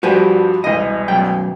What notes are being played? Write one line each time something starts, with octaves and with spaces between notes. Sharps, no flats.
G2 F3 G3 F#4 G4 G#5
E1 C2 D#5
B1 F#2 G5